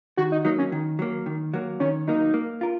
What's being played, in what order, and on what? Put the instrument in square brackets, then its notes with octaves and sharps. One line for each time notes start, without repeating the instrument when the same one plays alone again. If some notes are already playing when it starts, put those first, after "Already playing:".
[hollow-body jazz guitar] D#3 [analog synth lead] F#4
[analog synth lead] D#4
[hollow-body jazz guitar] F#3 A#3 [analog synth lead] D#4
[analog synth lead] C#4
[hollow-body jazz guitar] D#3
F#3 A#3
D#3
F#3 A#3
[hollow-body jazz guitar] D#3 [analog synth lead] C#4
[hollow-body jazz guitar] F#3 A#3 [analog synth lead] D#4
[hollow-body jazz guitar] A#3
F4 A#4